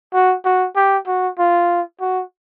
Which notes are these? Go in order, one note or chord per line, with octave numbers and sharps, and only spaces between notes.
F#4
F#4
G4
F#4
F4
F#4